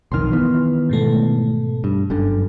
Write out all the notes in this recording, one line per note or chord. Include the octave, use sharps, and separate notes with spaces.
B1 F2 D#3 C6 F6
D#3 E3 B3
G#2 B2 A3
G2
G1 F#2 D3